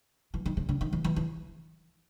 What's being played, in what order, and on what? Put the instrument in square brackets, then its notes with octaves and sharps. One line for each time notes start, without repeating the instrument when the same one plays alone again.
[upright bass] E3
D#3
D3
D3
D#3
E3
E3
E3